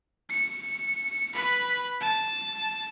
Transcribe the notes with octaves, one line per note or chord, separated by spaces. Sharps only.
C#7
B4 B5
A5